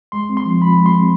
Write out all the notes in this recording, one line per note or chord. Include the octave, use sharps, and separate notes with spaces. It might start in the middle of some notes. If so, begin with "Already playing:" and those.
G#3 C6
C4
C6
F3
F3 B5
G#3
C6
C4